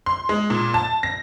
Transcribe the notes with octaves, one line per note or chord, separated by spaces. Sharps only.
C6
G#3
A#2
A5
A#6